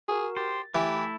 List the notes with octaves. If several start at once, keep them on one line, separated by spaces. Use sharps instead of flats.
F#4 G#4 A#4
G4 C5 A6
E3 A3 E4 G4